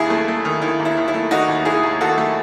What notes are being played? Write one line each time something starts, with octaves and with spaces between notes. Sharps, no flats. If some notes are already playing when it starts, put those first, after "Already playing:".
Already playing: D#2 E4 G#4
A3
A3
D#3
D#3 E4
D#2
E4
D#3
E4
A3
D#3 D#4 F#4
D#2
D#2 E4 G#4
D#2
D#3 F#4 A4
A3